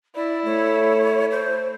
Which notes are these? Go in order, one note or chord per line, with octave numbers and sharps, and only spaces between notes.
E4 D5
A3 C#5
C5